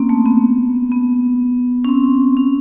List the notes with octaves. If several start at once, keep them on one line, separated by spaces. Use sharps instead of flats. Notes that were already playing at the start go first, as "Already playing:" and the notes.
Already playing: A#3 C4 C#4
A3
B3
B3
C#4
C4
C#4